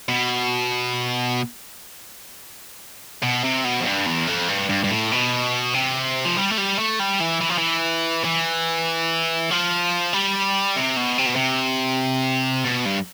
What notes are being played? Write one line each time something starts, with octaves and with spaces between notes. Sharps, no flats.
B2
B2
C3
B2
F2
G2
E2
F2
G2
G2
G2
A2
B2
C3
F3
G3
A3
G3
A3
G3
E3
E3
F3
E3
E3
F3
G3
C3
B2
C3
B2
C3
B2
G2